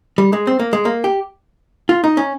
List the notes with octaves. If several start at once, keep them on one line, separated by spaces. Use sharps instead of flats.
G3
G#3
C4
A#3
G#3
A#3
G4
F4
D#4
C#4